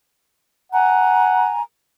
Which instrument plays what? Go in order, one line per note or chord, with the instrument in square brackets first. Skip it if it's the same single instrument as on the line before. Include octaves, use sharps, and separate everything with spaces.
[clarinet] F#5 [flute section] G#5 A#5